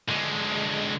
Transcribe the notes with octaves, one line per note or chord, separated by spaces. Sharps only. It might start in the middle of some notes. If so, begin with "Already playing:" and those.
D3 G#3